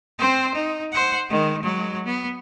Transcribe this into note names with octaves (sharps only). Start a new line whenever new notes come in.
C4 C5
D#4
C5 F#5
D#3 G#3
F#3 G#3
B3